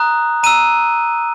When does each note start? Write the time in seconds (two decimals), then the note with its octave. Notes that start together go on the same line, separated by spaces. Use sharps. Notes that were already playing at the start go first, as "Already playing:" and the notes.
Already playing: A#5 D#6 F#6
0.43 A#5 E6 D#7